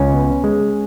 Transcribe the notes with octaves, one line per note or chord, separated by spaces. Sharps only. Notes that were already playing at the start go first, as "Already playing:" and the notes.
Already playing: C#2 C#4
B3
G#3